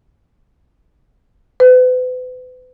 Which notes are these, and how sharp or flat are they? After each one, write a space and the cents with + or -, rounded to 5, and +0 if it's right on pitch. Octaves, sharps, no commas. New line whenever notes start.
B4 +40